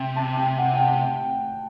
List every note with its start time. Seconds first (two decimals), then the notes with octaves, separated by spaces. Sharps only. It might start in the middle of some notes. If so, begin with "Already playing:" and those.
Already playing: C3 G5
0.16 A5
0.37 G5
0.58 F#5
0.74 G5
0.79 F#5